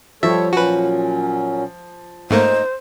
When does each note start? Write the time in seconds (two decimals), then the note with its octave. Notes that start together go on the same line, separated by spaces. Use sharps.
0.23 F3 G3 A4 C#5 E5
0.53 A#2 F#3 C#4 F#4 B4
2.31 G#2 A3 A#3 D#4 C5